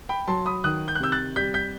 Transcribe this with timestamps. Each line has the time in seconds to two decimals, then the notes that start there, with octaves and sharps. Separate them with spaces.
0.09 G5 B5
0.27 F#3 A5 C6
0.46 B5 D#6
0.64 D#3 D#6 F#6
0.88 G6
0.95 F#6
1.00 C3 E6 G6
1.12 F#6 A6
1.36 G3 G6 B6
1.54 G6 B6